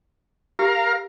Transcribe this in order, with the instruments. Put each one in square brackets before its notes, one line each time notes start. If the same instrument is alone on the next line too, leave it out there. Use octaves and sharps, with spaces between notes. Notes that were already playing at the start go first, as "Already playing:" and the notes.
[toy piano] G4 [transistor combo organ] A#4 F5